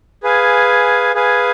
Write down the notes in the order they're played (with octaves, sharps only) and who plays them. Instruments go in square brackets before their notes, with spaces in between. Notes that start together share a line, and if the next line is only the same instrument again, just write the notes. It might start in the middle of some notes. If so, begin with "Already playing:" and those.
[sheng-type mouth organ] G#4 B4 F5 G#5
G#4 B4 F5 G#5